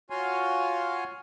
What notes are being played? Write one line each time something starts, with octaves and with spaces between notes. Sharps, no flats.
F4 F#4 C#5 F5 G#5 C6